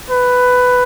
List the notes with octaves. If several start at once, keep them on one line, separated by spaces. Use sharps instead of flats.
B4